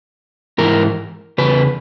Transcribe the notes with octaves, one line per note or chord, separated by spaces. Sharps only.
G#2 E3 A#4
E2 C#3 B4